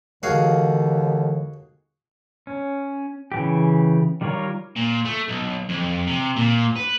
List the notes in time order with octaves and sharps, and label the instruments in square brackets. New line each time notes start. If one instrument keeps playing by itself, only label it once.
[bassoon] D#2 [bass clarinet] D3 [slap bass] E3 G#3 [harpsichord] F#4 G#4 F5
[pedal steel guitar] C#4
C#3 E3 G4
D#3 G3 F4 A#4 C#5
[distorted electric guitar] A#2
A3
B1
F2
C3
A#2
B4